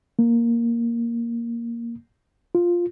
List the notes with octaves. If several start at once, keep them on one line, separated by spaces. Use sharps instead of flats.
A#3
F4